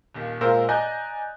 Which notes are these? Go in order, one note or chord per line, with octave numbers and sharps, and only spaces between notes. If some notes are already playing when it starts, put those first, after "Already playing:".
D#1 D#2
A#2 G#3 F4 A#4 C5 E6
D5 D#5 G#5 A#5 F#6 G6